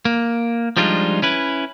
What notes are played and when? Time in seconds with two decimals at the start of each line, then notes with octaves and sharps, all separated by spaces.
0.05 A#3
0.77 F3 G3 G#3 D4 D#4 F4
1.22 C#4 E4 B4